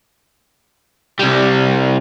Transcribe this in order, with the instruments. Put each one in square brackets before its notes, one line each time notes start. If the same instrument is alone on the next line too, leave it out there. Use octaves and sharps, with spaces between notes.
[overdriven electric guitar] C2 G3